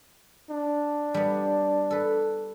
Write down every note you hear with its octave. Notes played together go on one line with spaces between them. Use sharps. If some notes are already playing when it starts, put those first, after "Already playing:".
D4
G3 B3
A4 B4